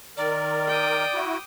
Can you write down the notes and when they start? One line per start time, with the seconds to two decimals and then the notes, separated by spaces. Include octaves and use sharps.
0.17 D#3 A#4 D5
0.67 G5 D6 D#6
1.14 E4 F#4